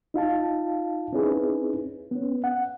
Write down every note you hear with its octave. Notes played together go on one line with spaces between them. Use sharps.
D#4 F4 F5 A5
C4 C#4 D#4 E4 G#4 B4
B3 C#4
F#5